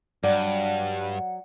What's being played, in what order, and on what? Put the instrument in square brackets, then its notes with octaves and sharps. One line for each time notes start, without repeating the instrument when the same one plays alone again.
[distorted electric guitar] G2 [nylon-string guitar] F#3 D5 [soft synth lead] F#5